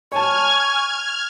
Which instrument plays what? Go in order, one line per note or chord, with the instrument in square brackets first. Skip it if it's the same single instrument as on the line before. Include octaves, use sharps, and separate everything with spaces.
[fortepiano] C#5 A5 [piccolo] G#5 [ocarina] C#6 [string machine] F6 G#6